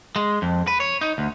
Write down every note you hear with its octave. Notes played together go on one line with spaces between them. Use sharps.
G#3
F2
B4
C#5
D#4
D2